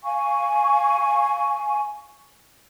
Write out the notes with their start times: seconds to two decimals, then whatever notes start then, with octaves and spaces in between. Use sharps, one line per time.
0.04 F5 G#5 C#6